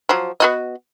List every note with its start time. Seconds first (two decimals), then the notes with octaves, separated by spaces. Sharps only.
0.09 F3 F#3
0.40 B3 F#4 D#5